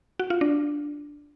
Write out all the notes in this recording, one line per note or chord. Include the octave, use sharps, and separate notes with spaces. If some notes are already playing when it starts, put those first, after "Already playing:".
F#4
F4
D4